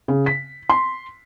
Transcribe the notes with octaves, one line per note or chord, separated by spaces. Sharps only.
C#3
B6
C6